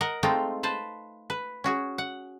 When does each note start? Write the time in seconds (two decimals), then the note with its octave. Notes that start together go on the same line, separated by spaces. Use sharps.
0.01 A#4 D#5 F#5
0.23 G#3 A3 C4 D#4 F4 G5
0.63 B4 C5 A5
1.30 B4
1.64 C#4 F#4 G#4
1.98 F#5